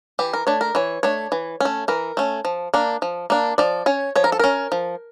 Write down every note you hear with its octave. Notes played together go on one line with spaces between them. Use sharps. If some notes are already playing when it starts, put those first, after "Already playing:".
E3 G4
A#4
A3 D4 C#5
A#4
E3 C#5
A3 D4 C#5
E3
A3 C#4
E3 A#4
A3 C#4
F3
A#3 D4
F3
A#3 D4
F3 D5
C#4 C#5
F3 C#5
A#4
A4
C#4 A#4
F3